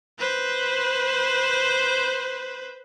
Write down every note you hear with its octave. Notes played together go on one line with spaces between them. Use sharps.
B4 C5